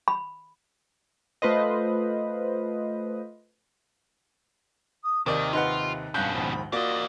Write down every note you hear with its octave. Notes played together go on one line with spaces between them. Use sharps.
B5
A3 F4 B4 C5 D#5
D#6
D#2 C3 D#3 A#4 D5 D#5
D#4 F4 B4 F#5
G2 B2 C#4 F5 F#6 G6
A#1 D#2 G#2 B5
E3 A#3 F4 F#4 D5 D#5